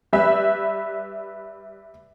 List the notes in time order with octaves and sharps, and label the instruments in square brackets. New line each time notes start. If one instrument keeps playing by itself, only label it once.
[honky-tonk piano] G3 B4 E5